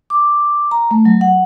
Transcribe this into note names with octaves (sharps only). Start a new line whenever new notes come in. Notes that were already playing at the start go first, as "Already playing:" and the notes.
D6
A#5
A3
F#3
F#5